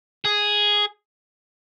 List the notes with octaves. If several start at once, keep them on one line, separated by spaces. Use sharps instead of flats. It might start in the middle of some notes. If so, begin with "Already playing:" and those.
G#4